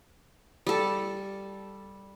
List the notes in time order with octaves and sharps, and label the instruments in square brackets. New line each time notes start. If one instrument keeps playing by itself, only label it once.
[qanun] G3 A4